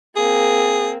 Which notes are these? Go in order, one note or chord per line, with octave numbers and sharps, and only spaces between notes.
A#3 C4 G#4